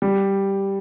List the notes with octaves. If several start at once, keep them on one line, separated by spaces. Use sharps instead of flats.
G3